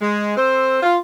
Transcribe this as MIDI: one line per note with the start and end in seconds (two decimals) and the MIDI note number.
0.01 0.34 56
0.37 0.80 60
0.37 0.80 69
0.37 0.80 72
0.82 0.97 65